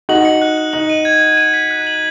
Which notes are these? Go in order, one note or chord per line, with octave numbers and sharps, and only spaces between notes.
D#4 F#4 F#7
C#7
F#6
F#6
D#4 F#7
D#7
G#6
G#6
D#7
B6
F#6
F#7